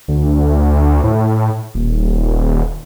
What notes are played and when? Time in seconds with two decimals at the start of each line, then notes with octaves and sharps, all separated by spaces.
0.08 D2
1.04 A2
1.75 D#1